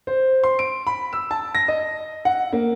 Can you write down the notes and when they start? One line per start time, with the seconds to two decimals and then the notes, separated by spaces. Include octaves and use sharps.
0.07 C5
0.44 C6
0.59 D7
0.87 B5
1.13 E6
1.31 A5
1.55 A#6
1.68 D#5
2.25 F#5
2.53 A#3